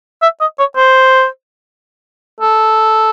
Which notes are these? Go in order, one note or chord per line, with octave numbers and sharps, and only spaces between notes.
E5
D#5
C#5
C5
A4